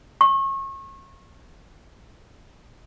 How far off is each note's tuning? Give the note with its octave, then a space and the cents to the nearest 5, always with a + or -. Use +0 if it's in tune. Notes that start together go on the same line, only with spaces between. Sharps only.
C#6 -30